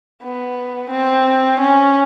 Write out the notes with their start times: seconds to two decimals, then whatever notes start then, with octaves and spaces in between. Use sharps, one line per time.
0.23 B3
0.90 C4
1.60 C#4